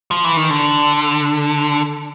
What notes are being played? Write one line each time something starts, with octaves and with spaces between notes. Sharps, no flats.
F3
E3
D#3
D3